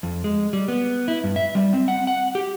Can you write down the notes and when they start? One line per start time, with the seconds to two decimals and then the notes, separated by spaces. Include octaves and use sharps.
0.03 F2
0.24 G#3
0.53 G3
0.68 B3
1.08 E4
1.24 G2
1.36 E5
1.55 G3
1.73 C4
1.88 F#5
2.07 F#5
2.35 G4